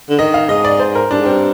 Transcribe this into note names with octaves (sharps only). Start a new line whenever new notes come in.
D3
D#3 D#5
F5
G#2 D#5
D5
C5
A#4
G2 D4
G#2
G2 C4